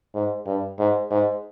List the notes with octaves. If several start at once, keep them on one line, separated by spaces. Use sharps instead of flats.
G#2
G2
G#2
G#2